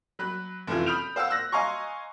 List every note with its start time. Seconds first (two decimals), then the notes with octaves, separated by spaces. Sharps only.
0.19 F#3 B5 F#6
0.67 F1 F#2 E3 F4
0.86 B5 D#6 F6 G6 D7 F7
1.16 C5 F5 F#5 E6
1.30 E6 F#6 A#6
1.52 D#5 F5 G#5 A#5 C6 C#6